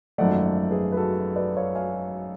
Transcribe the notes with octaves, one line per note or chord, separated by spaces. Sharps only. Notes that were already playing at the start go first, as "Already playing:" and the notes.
G#1 F#2 F3 A3 D5 F#5
G#4 B4
B4
F#4 A4
B4 D5
C#5 F5
F5 G#5